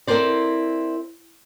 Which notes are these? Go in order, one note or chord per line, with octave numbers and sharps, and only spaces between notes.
C4 E4 A4 A#4 C5 D5